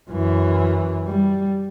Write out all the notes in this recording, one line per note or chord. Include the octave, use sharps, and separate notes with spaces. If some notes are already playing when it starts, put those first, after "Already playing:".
F#2 E3
G3